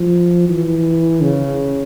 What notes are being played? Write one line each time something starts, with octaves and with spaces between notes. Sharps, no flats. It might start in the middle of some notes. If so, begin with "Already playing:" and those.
Already playing: F3
E3
C#3